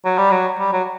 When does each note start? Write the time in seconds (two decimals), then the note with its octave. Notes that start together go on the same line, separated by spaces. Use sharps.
0.05 F#3
0.18 G3
0.31 F#3
0.59 G3
0.73 F#3